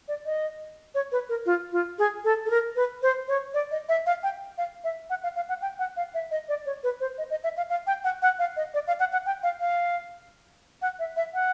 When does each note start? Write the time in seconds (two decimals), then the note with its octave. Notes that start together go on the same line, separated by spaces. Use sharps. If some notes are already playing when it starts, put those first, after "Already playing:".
0.08 D5
0.26 D#5
0.95 C#5
1.12 B4
1.29 A#4
1.46 F4
1.72 F4
1.99 G#4
2.24 A4
2.46 A4
2.50 A#4
2.76 B4
3.02 C5
3.28 C#5
3.54 D5
3.71 D#5
3.89 E5
4.06 F5
4.23 G5
4.58 F5
4.84 E5
5.10 F#5
5.23 F5
5.36 F5
5.49 F#5
5.62 G5
5.79 F#5
5.97 F5
6.14 E5
6.31 D#5
6.49 D5
6.66 C#5
6.83 B4
7.00 C5
7.18 D#5
7.30 D#5
7.44 E5
7.57 F5
7.70 F5
7.87 G5
8.04 F#5
8.22 F#5
8.39 F5
8.57 D#5
8.74 D5
8.87 F5
9.00 F#5
9.13 F#5
9.26 G5
9.43 F5
9.60 F5
10.82 F#5
10.99 E5
11.17 E5
11.34 F#5